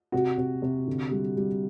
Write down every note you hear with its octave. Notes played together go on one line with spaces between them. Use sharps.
C3 F#4
C3
C3
D3
G3
G3